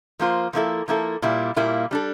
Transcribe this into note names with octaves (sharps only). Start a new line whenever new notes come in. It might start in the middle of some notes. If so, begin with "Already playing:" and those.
F3 A#3 F4 C5
F3 A#3 E4 A4
F3 A#3 E4 A4
A#2 G3 A#3 E4
A#2 G3 A#3 E4
G3 D4 A4